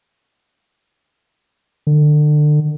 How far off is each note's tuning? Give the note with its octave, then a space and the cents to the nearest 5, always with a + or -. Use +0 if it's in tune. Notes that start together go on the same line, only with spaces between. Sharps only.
D3 +30